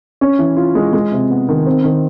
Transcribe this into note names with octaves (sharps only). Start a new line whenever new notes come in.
C#4
E3
F4
G#3
G#3
C3
B3
D#3
C4
D#3